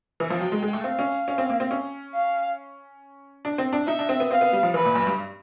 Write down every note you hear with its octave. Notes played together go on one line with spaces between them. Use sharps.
E3
F3
F#3 G5
G#3
G#3
A3
C4 F5
C#4
C#4
C4
A#3
C4
C#4
F5
D4
C4
D4
D#4 E5
D4
C4
B3
C4 F5
B3
G3
F3
E3 B4
A#2
F#2
G2